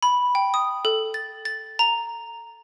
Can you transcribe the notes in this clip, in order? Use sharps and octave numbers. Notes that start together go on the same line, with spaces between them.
B5
G5
D#6
A4
A6
A6
A#5